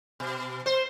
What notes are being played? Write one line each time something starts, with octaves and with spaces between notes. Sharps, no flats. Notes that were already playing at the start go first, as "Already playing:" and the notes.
B2
C5